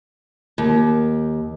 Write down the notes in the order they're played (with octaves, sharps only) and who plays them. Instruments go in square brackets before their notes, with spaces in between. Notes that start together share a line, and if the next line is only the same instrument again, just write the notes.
[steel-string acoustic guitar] D#2